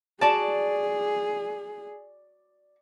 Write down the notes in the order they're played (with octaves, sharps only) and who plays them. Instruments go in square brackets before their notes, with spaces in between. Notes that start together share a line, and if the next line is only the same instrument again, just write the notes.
[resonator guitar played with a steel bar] F#4 A5 [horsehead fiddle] G#4 [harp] D5